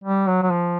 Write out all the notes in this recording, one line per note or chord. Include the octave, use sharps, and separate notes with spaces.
G3
F#3
F#3
F3